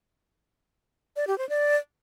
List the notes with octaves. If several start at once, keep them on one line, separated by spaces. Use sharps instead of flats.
D5
G4
C5
D5